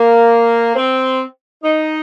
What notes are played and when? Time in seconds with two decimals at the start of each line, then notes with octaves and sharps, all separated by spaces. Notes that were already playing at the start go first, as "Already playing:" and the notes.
Already playing: A#3
0.76 C4
1.63 D#4